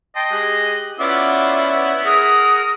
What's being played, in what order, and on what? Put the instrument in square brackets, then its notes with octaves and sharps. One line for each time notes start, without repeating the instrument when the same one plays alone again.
[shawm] D#5 [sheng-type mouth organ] G5 A5 C6
[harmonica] G#3 [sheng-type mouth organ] G4 F#6
[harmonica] B3 E4 E5 [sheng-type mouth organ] C#4 D5 F#5 [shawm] F4 [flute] D6
[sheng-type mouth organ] G#4 F#5 F6 [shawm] A#4 [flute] D#6